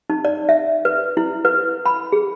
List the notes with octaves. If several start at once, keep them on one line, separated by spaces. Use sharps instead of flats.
D#4
D5
E5
B4
E4
B4
B5
G#4